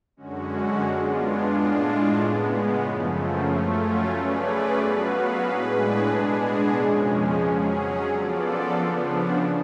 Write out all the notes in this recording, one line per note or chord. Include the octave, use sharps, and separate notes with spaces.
F#2 D3 G#3 C#4 F#4
G#3 B3 D4 F4
A2 G#3 D4 F4
C#3 G#3 B3
F#2 C#3 F3 A3
F#3 A3 C#4 F4
A3 C#4 G#4 B4 D5
F#3 B3 F#4 B4 F5
A2 G#3 D4 G#4 B4
B2 G#3 B3 D4 G#4
F2 C#3 F3 G#3 C#4
F#3 C#4 G#4
F3 B3 F4 A4 D5
C#3 F3 B3 D4